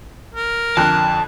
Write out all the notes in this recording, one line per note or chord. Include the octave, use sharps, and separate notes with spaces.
A#4
F2 D3 A5 F#6